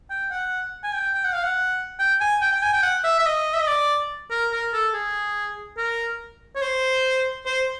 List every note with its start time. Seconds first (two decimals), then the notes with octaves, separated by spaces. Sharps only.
0.10 G5
0.31 F#5
0.83 G#5
0.94 G5
1.15 G5
1.24 F#5
1.34 F5
1.43 F#5
1.99 G5
2.20 G#5
2.41 G5
2.52 G5
2.62 G#5
2.73 G5
2.83 F#5
3.04 E5
3.19 E5
3.26 D#5
3.54 E5
3.60 D#5
3.67 D5
4.30 A#4
4.52 A#4
4.73 A4
4.94 G#4
5.77 A#4
6.55 C#5
6.62 C5
7.46 C5